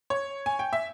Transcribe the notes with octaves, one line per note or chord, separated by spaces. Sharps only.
C#5
G#5
G5
E5